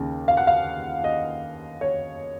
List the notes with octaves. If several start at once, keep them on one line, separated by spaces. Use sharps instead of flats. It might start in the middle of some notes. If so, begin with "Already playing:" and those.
Already playing: D#2 C#3
F5
F#5
F5
D#5
C#5